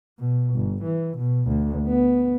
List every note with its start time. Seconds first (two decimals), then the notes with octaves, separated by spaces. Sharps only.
0.19 B2
0.55 G1
0.83 E3
1.18 B2
1.48 D2
1.87 B3